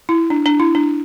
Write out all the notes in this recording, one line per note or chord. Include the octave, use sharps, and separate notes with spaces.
E4
D4
D4
E4
D4